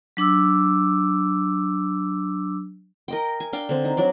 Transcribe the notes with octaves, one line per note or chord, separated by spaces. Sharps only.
F#3 D4 D6 E6
A#4 D#5 G5
G#5
D4 F5 G5
D3 C4
D#4
F#3 D4 D5